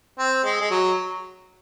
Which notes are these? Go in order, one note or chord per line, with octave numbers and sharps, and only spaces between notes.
C4
G#3
G#3
F#3